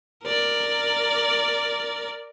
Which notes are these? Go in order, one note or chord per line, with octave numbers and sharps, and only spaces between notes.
A#4 D5